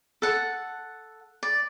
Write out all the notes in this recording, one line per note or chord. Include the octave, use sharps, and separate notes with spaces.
A4 F#5
D5